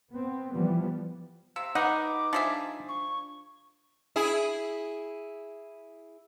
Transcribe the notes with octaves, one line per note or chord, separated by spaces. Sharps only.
B3 C4
E3 F3 G3 B3
C3 F5 E6
D#4 B4 F#5 B5 D6
F3 D4 G#4 E5
C#6
E4 G#4